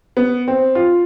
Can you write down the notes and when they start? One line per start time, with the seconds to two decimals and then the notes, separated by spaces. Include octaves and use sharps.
0.17 B3
0.48 C4
0.75 F4